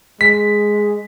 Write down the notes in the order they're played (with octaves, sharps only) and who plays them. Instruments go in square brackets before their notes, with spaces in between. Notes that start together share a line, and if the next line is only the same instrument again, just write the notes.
[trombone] G#3 [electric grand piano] B6